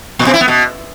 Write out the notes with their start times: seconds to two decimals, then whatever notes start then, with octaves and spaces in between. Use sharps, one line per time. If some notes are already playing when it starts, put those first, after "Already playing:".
0.19 A#2
0.27 B2
0.34 E4
0.41 B3
0.48 B2